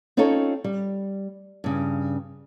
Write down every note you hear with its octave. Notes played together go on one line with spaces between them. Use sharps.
C4 C#4 D#4 F4 A4 C#5
G3
G2 C#3